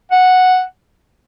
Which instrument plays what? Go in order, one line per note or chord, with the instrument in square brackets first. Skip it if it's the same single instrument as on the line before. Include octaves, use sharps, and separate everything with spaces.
[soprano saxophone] F#5